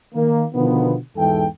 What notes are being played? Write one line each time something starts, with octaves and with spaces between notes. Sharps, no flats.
D#3 A#3
B2 D3 D#3 F3 B3
E2 G#2 B2 E3 A4 G5